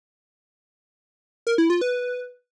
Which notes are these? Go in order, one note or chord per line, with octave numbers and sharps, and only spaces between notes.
A#4
E4
F4
B4